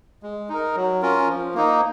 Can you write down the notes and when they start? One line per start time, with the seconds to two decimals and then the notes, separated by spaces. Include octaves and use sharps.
0.23 G#3
0.49 D#4 A#4
0.75 F#3
1.02 C#4 F4 A#4
1.28 F3
1.54 A#3 D#4